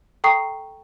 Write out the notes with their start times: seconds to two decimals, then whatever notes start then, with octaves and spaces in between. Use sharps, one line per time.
0.24 A4 G5 A#5 C#6 D#6 C7